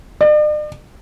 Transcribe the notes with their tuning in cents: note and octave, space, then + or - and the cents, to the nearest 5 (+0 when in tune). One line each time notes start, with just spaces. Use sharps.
D5 +45